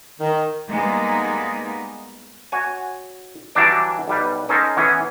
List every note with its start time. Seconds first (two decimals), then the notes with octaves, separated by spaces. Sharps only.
0.20 D#3
0.71 G3 G#3 A#3 B3 D#4 G#4
2.52 F#4 C#5 G#5
3.55 E3 F#3 G3 D4 D5
4.08 B1 G3 B4
4.49 C#4 D#4 A4 A#4 C5
4.77 E3 B3 C#4 G#4 C#5